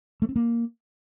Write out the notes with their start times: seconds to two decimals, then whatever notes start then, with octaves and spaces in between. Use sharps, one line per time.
0.22 A3
0.29 C4
0.36 A#3